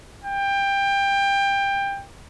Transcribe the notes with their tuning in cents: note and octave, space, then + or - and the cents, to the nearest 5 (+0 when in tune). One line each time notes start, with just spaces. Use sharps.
G5 +20